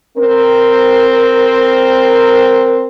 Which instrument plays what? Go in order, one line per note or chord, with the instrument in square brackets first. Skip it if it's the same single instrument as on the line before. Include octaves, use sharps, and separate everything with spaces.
[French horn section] C4 A#4